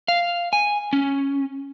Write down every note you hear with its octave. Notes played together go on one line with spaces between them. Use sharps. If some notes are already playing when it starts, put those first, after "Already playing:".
F5
G#5
C#4